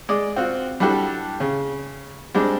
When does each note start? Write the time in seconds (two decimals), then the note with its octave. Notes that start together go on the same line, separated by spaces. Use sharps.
0.09 G#3 D5 D#6
0.36 C4 F4 F#4
0.80 G3 D4 E4 F#4 G4 A4
1.40 C#3
2.34 G3 G#3 C4 D4